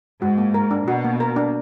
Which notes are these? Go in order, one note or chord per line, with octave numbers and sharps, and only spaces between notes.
G#2 F#4
A#3
A#4
D4
B2 F#4
A#3
A#4
D4